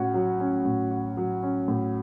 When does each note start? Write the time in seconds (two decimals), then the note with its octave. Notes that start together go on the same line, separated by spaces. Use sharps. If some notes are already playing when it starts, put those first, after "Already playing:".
Already playing: A2 C#4 F#4
0.14 F#3
0.40 C#4
0.65 A2
0.91 F#4
1.17 F#3
1.43 C#4
1.68 A2